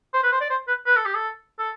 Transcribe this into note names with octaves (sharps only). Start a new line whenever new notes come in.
C5
B4
C5
D5
C5
B4
B4
A4
G4
A4
A4